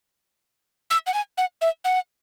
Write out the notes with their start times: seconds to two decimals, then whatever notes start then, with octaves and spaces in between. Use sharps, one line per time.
0.91 E6
1.07 F#5
1.14 G#5
1.38 F#5
1.61 E5
1.85 F#5